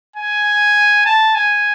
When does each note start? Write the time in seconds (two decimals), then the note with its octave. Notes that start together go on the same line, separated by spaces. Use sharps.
0.16 G#5
1.06 A5
1.35 G#5